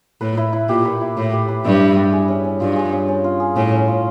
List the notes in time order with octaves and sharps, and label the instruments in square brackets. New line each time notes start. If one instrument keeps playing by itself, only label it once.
[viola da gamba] A2 [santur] B4
[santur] E4
E4
[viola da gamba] A#2 [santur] G4
[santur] B4
E4
[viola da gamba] A2 [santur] E4
[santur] G4
B4
[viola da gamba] G2 [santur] E4
[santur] E4
G4
G#4
C#4
C#4
[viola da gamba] G2 [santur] F4
[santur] G#4
C#4
C#4
F4
G#4
[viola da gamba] A2 [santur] C#4
[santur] C#4
F4